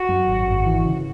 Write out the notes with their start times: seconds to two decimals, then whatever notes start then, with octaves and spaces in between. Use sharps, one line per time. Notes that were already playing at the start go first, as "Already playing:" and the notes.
Already playing: F#4
0.09 F#2
0.27 G#1
0.47 G#1
0.66 E3
0.85 C#3